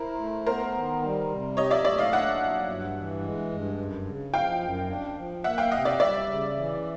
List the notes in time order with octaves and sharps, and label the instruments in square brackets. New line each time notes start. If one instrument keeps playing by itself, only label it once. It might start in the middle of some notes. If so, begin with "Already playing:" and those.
Already playing: [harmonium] E4 [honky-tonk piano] A#4 C5
[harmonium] A3
[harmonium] B3 [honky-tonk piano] A#4 C5
[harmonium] D#3
G3
C3
[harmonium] G4 [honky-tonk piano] C#5 D#5
[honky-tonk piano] D5 E5
[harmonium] A3 [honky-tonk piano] D5 E5
[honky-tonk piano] D#5 F5
[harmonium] D4 [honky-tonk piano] E5 F#5
[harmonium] F#3
G2
E3
G#3
G2
F#2
C#3
[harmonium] F3 [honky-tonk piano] F5 G5
[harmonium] F#2
D4
F3
[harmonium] A#3 [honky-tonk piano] E5 F#5
[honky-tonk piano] F5 G5
[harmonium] C3 [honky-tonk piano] D#5 F5
[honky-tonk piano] D5 E5
[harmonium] G3 [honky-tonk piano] D5 E5
[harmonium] C#3
E3